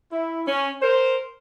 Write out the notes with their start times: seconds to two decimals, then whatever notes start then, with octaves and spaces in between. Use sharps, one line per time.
0.12 E4
0.47 C#4
0.81 A#4 C5